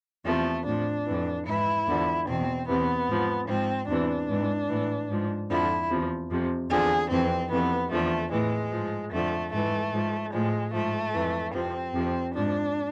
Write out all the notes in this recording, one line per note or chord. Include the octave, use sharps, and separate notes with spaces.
E2 C3 F3 A3
A2 F3 D4
F2 E3
G#2 E3 E4
E2 D3 F3
E2 B2 C4
E2 C3 E3 B3
G#2 F3
G#2 F3 C4
E2 C3 E3 D4
G#2 E3
A2 E3
G#2 F3
F2 D3 F3 E4
E2 C3 F3
F2 C3 F3
E2 D3 F3 G#4
F2 C3 E3 C4
F2 C3 E3 B3
E2 D3 F3 A3
A2 E3 G#3
G#2 F3
F2 D3 F3 A3
G#2 E3 A3
G#2 F3
A2 F3 G#3
G#2 F3 A3
F2 E3
F2 C3 F3 C4
F2 C3 F3
G#2 F3 D4